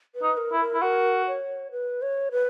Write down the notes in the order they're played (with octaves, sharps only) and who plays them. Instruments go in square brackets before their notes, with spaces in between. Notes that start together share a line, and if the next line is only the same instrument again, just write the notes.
[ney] B4
[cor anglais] D#4
[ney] A#4
[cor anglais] E4
[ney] A#4
[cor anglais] E4
[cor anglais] F#4 [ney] A#4
[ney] C#5
B4
C#5
B4